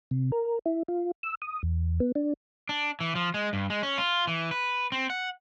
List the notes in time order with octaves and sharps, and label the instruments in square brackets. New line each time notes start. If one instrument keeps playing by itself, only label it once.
[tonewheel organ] C3
A#4
E4
F4
E6
D#6
E2
B3
D4
[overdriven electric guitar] D4
E3
F3
G#3
G2
G#3
C#4
F4
E3
B4
C4
F#5